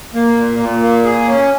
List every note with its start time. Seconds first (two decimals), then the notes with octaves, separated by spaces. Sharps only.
0.14 A#3
0.37 A#2
0.60 A#2
0.82 A#3
1.04 G#4
1.27 C#4